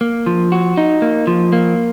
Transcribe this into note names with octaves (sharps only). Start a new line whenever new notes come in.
A#3
F3
F#4
D#4
A#3
F3
A#3